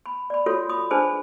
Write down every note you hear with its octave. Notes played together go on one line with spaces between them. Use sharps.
B5
D5 B5
F4 F#4 A4 C#5
B5 D#6
D4 G#4 B4 C5 A5 B5